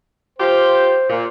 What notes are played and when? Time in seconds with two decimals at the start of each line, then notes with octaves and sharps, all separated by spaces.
0.39 F4 G4 C5
1.10 A#2